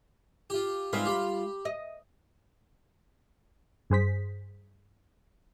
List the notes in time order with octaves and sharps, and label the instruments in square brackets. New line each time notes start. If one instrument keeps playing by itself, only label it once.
[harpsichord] F4 G4
[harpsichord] G#2 C4 G#4 [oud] G3 F4 B4
[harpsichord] G4 B5
[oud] D#5
[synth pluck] G2 G#4 C5 B6